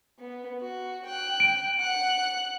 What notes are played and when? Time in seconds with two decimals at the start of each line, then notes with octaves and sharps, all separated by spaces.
0.19 B3
0.61 F#4
1.05 G5 F#6
1.40 D7
1.78 F#5 F#6